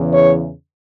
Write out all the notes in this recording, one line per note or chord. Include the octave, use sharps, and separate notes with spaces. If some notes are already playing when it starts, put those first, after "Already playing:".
Already playing: E2 C#3 E3
C#5